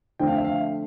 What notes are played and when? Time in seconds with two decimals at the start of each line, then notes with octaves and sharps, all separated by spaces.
0.19 D3 F3 A3 C4 G5
0.27 F5
0.36 E5
0.44 F5